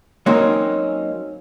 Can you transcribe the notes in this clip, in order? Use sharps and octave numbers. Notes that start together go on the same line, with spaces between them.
F#3 A#3 C4 C#4 D#4